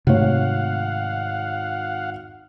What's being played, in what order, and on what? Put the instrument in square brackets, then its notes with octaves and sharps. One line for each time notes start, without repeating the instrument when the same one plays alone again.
[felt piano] G#1 C#5 [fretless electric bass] C3 A3 [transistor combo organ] F5 F#5